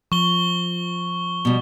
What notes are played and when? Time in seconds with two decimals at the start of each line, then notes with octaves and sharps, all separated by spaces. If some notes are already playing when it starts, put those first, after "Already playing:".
0.12 F3 C#6 G7
1.45 B2 G3